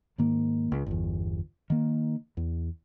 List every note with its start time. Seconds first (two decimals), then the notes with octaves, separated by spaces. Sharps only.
0.18 G#2 D#3 A#3
0.72 C#2
0.86 G1 E2
1.70 D#3 A#3
2.37 E2